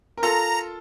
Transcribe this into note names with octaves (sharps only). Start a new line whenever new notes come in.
A#4
F4 A4 A#5